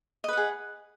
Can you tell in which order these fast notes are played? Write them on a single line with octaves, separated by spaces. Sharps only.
D#5 B4 F#5 G#4